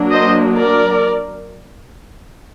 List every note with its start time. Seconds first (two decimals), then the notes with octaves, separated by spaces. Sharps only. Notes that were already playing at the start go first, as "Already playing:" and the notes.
Already playing: F#3 A#3 D4
0.11 C5 D#5
0.55 A#4 D5